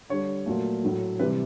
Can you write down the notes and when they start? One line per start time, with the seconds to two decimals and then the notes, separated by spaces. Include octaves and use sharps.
0.09 D3 G3 C#5
0.46 A#2 F#3 A3
0.84 A2 F#3 A3
1.19 C3 E3 G3 B4